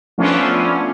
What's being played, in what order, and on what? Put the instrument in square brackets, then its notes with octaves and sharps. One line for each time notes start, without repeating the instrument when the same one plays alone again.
[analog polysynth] F3 A3 B3 C#4 D4 F4